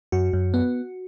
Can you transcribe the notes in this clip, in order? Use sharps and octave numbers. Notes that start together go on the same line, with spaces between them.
F#2 F#4
F#2
B3